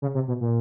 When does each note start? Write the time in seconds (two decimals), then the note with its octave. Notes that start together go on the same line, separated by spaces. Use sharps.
0.02 C#3
0.14 C3
0.28 B2
0.41 A#2